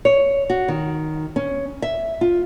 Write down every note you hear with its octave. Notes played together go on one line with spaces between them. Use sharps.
C#5
F#4
D#3
C#4
E5
F4